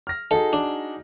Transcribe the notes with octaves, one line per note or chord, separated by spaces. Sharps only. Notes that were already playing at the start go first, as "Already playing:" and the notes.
F6 A#6
D#4 F#4 G#4 A4
D4